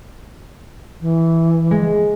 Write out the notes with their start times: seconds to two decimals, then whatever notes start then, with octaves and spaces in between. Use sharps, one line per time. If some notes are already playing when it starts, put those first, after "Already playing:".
1.01 E3
1.71 G#3